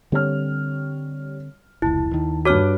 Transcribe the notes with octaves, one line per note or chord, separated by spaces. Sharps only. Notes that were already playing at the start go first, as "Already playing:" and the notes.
D3 G3 C4 C#5 F6
F1 C#2 E4 A5
D#2 D#3
G2 F#4 C#5 D6 F6